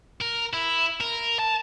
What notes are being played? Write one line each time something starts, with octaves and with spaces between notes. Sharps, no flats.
A#4
E4
A#4
A5